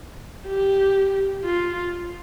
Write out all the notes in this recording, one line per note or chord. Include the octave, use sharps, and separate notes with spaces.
G4
F4